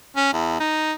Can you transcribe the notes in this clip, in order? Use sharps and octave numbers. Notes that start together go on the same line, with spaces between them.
C#4
E2
D#4